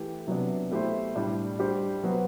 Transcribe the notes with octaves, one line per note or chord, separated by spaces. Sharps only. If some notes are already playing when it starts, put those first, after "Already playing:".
Already playing: E3 A3 E4 G4 B4
C3 F#3 B3 D4
B2 A3 E4 G4 C5
A2 G3 D4
G3 D4 G4 C5
F#3 B3 F#4 C5